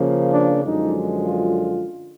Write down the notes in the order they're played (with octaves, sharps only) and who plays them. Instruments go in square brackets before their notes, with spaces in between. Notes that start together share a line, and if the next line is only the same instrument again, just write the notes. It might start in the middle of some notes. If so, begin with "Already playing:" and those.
Already playing: [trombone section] C#3 F3 A#3
D4
F#2 D3 F3 G#3 D#4
F4